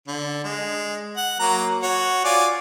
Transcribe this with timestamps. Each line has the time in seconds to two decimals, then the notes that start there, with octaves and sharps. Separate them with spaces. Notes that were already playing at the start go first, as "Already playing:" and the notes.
0.08 D3
0.44 G#3
1.17 F#5
1.40 F#3 A#3 A#5
1.83 F#4 C#5
2.25 F4 D5 G#5